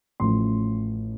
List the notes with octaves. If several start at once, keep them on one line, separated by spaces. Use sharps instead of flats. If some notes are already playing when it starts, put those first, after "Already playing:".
A1 A2 F3 C6